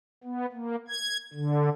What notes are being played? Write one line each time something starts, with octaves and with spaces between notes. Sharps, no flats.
B3
A#3
G#6
D3